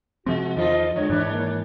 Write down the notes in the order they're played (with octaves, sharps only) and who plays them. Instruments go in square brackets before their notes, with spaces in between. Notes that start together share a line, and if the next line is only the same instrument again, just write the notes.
[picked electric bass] C3 F3 C4 [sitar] G#3 [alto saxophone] F#4
[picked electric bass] E2 [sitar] D#3 F4 A4 [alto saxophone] F3 [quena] D#5
[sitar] D3 [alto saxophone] G#3 [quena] C#5
[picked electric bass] G#2 E3 [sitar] D#3 D4
[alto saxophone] A#3